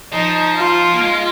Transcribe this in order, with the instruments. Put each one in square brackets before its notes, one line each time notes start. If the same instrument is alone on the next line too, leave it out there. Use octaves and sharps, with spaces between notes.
[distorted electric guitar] F3 [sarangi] D#4
[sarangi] F4
[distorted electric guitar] A#3
G#3